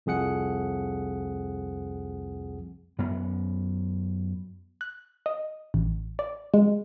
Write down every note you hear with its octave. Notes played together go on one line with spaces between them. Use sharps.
C2 F2 G#4 F#5 C#7
F#2 B3
F#6
D#5
A1
D5
G#3